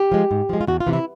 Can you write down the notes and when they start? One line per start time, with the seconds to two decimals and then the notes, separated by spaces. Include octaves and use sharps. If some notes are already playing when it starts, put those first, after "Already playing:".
Already playing: G4
0.12 F3 G#3
0.31 G#2
0.49 F3 G#3
0.61 F4
0.67 E2 F#4
0.80 F4
0.87 C3 E3
0.93 E4